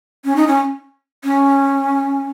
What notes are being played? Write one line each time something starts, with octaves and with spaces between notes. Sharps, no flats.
C#4
D#4
C#4
C#4